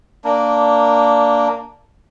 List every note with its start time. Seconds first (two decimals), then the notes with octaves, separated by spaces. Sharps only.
0.24 A#3 D4